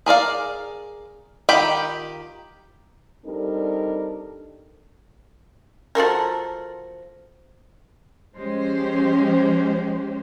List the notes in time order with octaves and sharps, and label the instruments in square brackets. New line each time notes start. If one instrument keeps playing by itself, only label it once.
[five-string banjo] G#4 A#4 D5 F5
D#3 F4 G4 G5 B5
[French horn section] G3 C4 D4 D#4 A4 A#4
[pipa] F3 F#4 A4 A#4
[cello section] F3 G#3 C#4 G4 C5